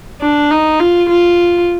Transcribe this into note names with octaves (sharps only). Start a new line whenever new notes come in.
D4
D#4
F4
F4